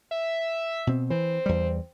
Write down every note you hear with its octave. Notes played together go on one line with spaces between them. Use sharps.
E5
B2 C4
E3 C4
E2 G3